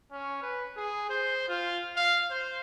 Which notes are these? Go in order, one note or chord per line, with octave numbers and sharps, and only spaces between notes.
C#4
B4
G#4
C5
F4
F5
C5